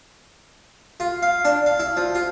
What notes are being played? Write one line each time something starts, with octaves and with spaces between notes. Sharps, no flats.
F4
F5
D4
F5
E4
F3
F4